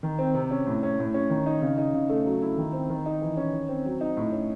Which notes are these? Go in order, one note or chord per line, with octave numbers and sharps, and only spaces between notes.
D#3
C4
C3
C#4
A2
C#4
A2
C#4
D#3
D#4
C#3
D#4
C#3
A3
F#3
E4
D#3
C4
D#3
D#4
E3
C#4
D#3
C4
F#3
D#4
A2
C#4